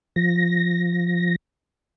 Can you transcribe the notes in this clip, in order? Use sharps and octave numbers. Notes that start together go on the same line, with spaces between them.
F3 A#6